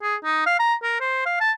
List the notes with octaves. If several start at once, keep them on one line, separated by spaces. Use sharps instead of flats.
G#4
D#4
F5
A#5
A#4
C5
F5
A5